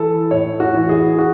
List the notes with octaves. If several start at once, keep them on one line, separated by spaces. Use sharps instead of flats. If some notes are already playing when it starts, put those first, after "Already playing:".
Already playing: E3 A4
A2 C#5
F#4
E3
G#4
F#4